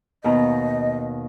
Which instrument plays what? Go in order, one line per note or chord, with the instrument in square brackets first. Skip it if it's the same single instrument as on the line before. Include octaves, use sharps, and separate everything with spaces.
[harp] D#2 B2 A#5 [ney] D#5